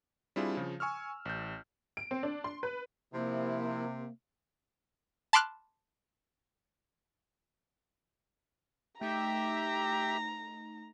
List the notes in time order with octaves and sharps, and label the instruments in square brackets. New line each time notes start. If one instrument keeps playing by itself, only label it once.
[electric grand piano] G3 C4 D4 E4 F4 G#4
C#3 F3
G#5 C#6 E6 F6
A1 G6
[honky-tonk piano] D7
C4
D4
C6
B4
[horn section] C3 [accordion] F3 E4 [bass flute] A#3
[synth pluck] A5 B5 C6 D6 F6 F#6
[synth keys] A3 D#4 [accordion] G4 E5 G5 [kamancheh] A#5